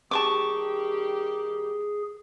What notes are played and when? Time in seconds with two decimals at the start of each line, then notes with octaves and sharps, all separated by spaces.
0.11 D#3 G3 G4 G#4 A5 C#6 D6